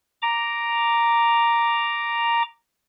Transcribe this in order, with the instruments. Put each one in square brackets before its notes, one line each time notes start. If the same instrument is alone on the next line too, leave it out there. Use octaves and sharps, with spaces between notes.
[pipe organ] A#5 D6